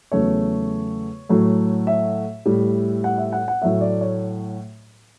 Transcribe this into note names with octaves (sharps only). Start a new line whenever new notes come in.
E2 C#3 F#3 A3 C#5
A2 F#3 A3
E5
A2 G3
F#5
E5
F#5
F#5
A2 F#3 A3 E5
D5
C#5